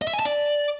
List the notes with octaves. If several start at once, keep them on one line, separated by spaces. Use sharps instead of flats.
D#5
E5
G#5
A5
D5